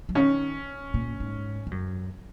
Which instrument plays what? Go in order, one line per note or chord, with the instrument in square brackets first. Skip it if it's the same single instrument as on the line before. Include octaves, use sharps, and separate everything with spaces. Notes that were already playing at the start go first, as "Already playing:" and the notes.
[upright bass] F#3
[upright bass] D#3 [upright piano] C#4
[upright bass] A#2
G#2
G#2
F#2